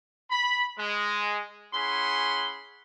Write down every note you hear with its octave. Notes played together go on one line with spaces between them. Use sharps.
B5
G#3
C#4 E4 G#4 F#5 B5 C6